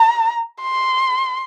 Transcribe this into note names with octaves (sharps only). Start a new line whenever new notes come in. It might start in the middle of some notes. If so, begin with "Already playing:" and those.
Already playing: A#5
C6